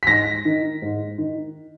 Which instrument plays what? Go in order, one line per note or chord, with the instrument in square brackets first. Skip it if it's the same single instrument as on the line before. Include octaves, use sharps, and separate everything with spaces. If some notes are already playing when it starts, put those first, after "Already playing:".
[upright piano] B6
G#2 A#6
D#3
G#2
D#3